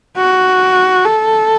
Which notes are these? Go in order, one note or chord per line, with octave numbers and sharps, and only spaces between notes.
F#4
A4